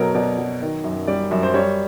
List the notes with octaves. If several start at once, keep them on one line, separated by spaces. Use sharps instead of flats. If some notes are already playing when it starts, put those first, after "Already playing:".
Already playing: B2 F#3 A4 A#4
B2 D5
F#3
D#3
F#2
G3 D5
F#2
C5
G3 C#5